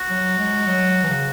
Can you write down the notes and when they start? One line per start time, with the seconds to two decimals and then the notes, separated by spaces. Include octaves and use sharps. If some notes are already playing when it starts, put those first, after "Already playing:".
Already playing: F#4
0.10 F#3
0.38 G#3
0.67 F#3
1.03 E3
1.10 C#3